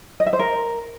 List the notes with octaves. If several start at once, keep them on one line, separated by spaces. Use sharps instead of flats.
D#5
E5
C5
A#4